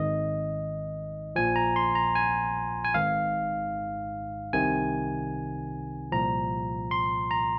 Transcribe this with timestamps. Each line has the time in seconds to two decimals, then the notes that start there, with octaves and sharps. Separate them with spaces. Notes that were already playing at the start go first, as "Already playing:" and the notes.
Already playing: G#1 G#2 D#3 D#5
1.36 A#1 A#2 F3 G#5
1.56 A#5
1.76 C6
1.95 A#5
2.15 G#5
2.85 G#5
2.94 G#1 G#2 D#3 F5
4.53 C2 C3 D#3 G#5
6.12 C2 A#2 F3 A#5
6.91 C6
7.31 A#5